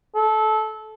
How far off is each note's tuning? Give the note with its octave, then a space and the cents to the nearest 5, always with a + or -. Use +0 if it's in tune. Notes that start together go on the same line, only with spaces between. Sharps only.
A4 -20